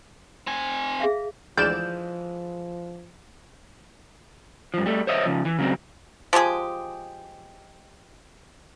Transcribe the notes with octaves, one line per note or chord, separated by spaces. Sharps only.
C4 G#5
G#4 E5 F5
D2 E3 F3 G#3 D5 F6 G6 E7
G2 F3
G3 A3
C5 C#5 D#5 E5
C#3 F3
E3
C#3 F#3 C4
F3 G#3 G4 G#4